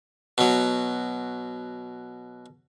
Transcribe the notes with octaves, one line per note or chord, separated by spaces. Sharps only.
B2 F#3